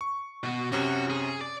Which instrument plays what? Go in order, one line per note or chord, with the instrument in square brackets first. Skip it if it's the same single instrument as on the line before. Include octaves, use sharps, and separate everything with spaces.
[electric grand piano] C#6
[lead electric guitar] B2 F#4
[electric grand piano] F#2 C3 C#4 [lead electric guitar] F#4
[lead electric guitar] G#4
D5